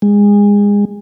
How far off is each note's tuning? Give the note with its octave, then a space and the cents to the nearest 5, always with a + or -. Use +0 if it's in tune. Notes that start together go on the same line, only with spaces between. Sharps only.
G#3 -25